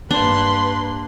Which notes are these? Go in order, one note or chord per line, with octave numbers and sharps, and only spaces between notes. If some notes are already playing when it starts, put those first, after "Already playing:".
G2 A#3 D4 B4 C6